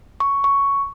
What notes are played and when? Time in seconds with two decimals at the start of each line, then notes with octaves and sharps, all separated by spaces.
0.20 C#6
0.44 C#6